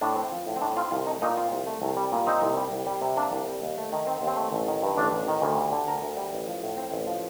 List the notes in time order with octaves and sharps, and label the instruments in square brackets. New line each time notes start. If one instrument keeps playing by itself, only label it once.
[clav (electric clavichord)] A2 D4
C4
F3
A2
C4
A2 D4
C4 F4
C2 F4
A3 D#4
A#2 D#4
C4 F4
C2
A3
C2
G3
A#2
C4 D#4
C2
G3
C2
G3
C3
A#3 D4
C2
G3
D#2
A3
D#3
C4
D#2
C4
A3
A1
D#3
G2
A1 D4
A1
D#3
D2
G3
D3
D2 A#4
D2
G3
A1
F3
A2
C4
A1
F3